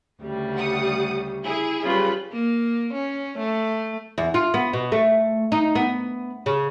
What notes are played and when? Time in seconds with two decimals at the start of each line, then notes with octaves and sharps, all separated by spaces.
0.21 D2 C#3 G3
0.55 F#5 D#6
1.44 E4 G#4
1.84 C#3 F#3 G3 F4 B4 B5
2.32 A#3
2.94 C#4
3.39 A3
4.18 E2
4.34 F4
4.54 B3
4.73 B2
4.92 A3
5.52 D#4
5.75 B3
6.46 C#3